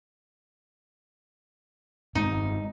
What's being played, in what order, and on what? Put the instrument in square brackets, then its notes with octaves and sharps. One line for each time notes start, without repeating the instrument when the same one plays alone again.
[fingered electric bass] G2 G#3 C4 [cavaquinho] D#4